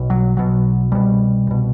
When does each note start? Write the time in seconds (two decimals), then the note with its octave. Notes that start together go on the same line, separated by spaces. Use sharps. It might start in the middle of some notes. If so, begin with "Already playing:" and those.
Already playing: B1 B2
0.10 F#3
0.37 B1 B2 F#3
0.92 C2 B2 G3
1.47 C2 B2